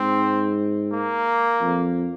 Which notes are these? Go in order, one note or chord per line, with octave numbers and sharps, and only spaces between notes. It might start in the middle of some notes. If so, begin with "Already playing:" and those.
Already playing: G#2 C4
A#3
F2